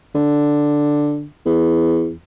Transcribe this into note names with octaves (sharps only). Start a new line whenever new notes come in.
D3
E2